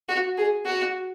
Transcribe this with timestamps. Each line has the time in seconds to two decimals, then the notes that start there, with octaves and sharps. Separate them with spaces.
0.09 F#4
0.37 G#4
0.65 F#4